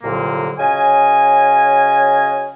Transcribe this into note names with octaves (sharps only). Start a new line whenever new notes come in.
C2 F2 A#2 D3 F#3 A#3
C#3 F#3 D#5 G#5